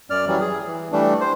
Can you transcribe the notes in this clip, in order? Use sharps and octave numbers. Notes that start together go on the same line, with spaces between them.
F#2 D5 F6
E3 F#3 G3
G#4
E3
E3 G3 A3 D4
C5